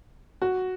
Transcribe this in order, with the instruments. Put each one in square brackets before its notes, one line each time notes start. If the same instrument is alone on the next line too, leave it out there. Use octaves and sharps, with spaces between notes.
[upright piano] F#4